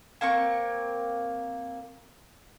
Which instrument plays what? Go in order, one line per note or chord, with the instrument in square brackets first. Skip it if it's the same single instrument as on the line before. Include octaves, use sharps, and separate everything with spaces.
[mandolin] A#3 C4 A#4 C#6